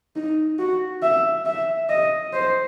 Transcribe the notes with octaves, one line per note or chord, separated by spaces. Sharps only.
D#4
F#4
E5
E5
D#5
C5